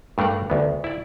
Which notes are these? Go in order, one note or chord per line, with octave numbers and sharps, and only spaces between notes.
G2 A3 D4 A#4 F#5
D2 B3
E4 D5